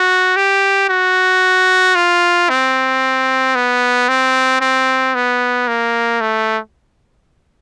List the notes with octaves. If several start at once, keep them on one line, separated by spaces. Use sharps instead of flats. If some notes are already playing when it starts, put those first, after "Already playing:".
Already playing: F#4
G4
F#4
F4
C4
B3
C4
C4
B3
A#3
A3